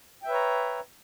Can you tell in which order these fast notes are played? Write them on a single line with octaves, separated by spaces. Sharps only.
G5 E5 B4 C#5 A#5